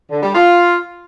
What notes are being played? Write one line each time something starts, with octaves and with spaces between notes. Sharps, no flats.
D3
G3
F4